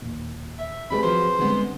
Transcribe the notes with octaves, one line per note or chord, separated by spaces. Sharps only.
D#2 A#2
E5
D#2 G3 A3 C4 G#4 B4 B5
F3 F#3 C5
D3 G3 G#3 B3 C4